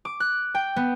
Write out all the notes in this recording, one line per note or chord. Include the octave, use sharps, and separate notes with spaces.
D6
F#6
G5
B3